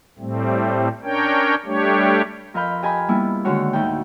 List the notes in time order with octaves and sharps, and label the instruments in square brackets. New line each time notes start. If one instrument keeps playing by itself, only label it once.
[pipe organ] A2 G3 A3 C4
C#4 D4 A#4 C#5 G5
G3 A3 D4 G4 C#5
[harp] F2 A#4 D#5 F5 B5 G6
G4 D#5 G#5 A#5 B5 D#6
G3 A#3 B3 D4 E4
D3 D#3 G#3 D#4 F#4 C#5
D2 A2 D#4 G5